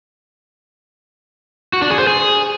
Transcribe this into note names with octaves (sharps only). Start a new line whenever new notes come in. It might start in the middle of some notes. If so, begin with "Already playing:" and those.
F#4
D4
G#4
C5
G#4